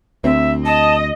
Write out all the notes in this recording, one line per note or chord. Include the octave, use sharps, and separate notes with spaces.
D2 C4 E5
D#5 A5